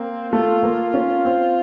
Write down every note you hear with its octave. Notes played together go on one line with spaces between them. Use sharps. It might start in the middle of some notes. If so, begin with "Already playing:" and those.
Already playing: A#3 C4
A3 F4
A#3
C#4
C4